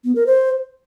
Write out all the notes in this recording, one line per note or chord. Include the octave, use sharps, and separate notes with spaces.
B3
A#4
C5